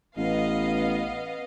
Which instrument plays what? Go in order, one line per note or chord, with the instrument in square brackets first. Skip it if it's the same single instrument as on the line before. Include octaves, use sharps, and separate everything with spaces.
[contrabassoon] A1 [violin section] B3 D#5 F5